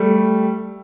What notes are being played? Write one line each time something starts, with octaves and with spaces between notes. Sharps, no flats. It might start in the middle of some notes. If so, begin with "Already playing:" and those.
Already playing: G3 A3